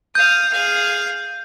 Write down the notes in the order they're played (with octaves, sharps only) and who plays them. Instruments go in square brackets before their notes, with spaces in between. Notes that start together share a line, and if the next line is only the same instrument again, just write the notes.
[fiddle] F5 D#6 [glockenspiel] G6
[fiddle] G#4 F5